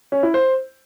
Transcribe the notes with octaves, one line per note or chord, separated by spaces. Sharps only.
C#4
E4
C5